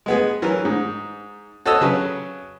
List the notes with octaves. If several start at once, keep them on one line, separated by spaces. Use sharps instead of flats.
G#3 B3 G#4
E3 F#3 A#4
G#2
F#4 A4 C#5 D#5 D#6 E6
C#3 F#3 B4